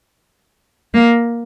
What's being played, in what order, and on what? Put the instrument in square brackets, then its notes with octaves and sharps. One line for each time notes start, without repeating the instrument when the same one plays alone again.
[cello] A#3